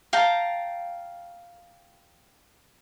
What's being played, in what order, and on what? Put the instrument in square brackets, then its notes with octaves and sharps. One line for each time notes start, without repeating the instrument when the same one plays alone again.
[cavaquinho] F5 G5 A5 A#5